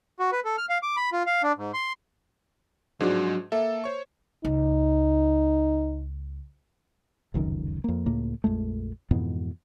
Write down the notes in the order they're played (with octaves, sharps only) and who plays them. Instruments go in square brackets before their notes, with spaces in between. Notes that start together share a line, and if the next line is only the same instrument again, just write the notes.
[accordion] F#4
B4
A4
F6
F5
D6
B5
F4
F5
D4
G#2
C6
[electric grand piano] G#2 F3 G#3 [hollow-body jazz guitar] F#3 D4 F#4
[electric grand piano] A#3 A4 [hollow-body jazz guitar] E5
[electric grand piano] C5 C#5 C#6
[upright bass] C#2 [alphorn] D#4
[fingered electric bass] F1 C#2 F#2 D#3
F2 A#3
C#2 A2 A#3
A#1 F2 G#3 A3
F2 G#2 B2 E3